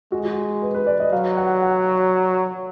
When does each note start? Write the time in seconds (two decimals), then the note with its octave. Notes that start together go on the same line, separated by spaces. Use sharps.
0.12 G#3 F#4
0.25 F#4
0.62 B4
0.74 B4
0.87 D5
1.00 D#5
1.12 F#3 F5
1.37 F#5
1.62 F#5